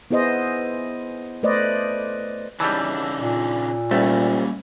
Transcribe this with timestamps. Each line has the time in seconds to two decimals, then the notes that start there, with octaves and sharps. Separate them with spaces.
0.11 B3 E4 G#4 C5 D#5
1.43 A3 B4 C5 D5 D#5
2.60 C#3 E3 G3 D4 D#4 A5 E6
3.19 A#2
3.91 C2 F#3 G3 A3 A#3 C#4 G5